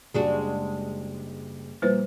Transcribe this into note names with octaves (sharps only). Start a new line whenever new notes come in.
F#1 G3 G#3 D4 F#4
A#2 F3 G3 A#3 B4 C5